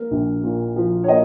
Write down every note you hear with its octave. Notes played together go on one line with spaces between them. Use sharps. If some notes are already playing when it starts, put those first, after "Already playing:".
Already playing: A#3 A#4
A#1
A#2
F3
C#5
A#3 D#5